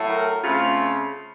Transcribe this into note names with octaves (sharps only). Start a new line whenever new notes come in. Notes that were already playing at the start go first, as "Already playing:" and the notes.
Already playing: A2 F#3 A3
A#4
C#3 A3 C4 F4